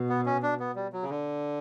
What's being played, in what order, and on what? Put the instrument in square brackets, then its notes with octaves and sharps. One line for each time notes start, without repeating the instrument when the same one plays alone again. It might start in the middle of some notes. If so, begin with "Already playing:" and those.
Already playing: [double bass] B2
[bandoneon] B3
C#4
D4
B3
G3
F#3
C#3
D3